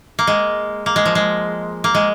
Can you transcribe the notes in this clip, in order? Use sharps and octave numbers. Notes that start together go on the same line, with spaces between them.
A#3
G#3
A#3
G#3
F3
G#3
A#3
G#3